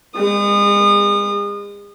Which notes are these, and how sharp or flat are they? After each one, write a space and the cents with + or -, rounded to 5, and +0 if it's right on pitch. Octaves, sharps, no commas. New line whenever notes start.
G#3 -40 D#6 -30